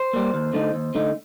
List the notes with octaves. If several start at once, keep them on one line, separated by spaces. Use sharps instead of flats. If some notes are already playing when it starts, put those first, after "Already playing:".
Already playing: C5
G3 A#3
D#2
D3 A3 D#4
D#2
D3 A3 D#4